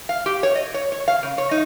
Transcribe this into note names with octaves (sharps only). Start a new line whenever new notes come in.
F5
G4
C#5
D#5
C#5
C#5
F5
C#3
C#5
D#4